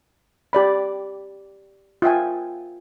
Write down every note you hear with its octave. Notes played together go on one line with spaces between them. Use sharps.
G4 D5 B5
F4 E5 G5 G#5